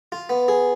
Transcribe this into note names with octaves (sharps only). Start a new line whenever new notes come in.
F4
B3
G#4